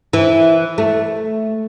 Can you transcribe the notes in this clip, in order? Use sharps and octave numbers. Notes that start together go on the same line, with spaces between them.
E3
A3